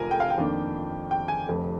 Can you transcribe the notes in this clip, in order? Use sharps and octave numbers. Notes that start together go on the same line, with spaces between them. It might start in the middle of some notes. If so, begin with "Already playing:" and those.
Already playing: F1 F2 D3 F3 A#4 G#5
G5
F5
G5
F2 D#3 A#3 D4
G5
G#5
F1 F2 D3